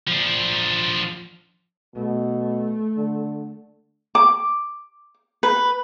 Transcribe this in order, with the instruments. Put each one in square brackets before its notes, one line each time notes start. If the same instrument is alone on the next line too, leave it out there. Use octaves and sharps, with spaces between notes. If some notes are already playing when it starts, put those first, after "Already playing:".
[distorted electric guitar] F3 D4
[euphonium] B2 [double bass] A3
[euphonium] D3
[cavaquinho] D6
B4